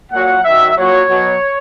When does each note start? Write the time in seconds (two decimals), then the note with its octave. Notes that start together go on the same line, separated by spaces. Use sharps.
0.12 A#2 F#3 F#5
0.45 F#2 D#3 F#3 E5
0.77 A#2 F#3 C#5
1.09 B2 F#3